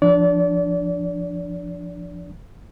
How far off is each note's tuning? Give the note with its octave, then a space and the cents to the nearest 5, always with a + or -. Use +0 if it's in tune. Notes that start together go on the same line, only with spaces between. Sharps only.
F3 -15 D4 +0 D5 -35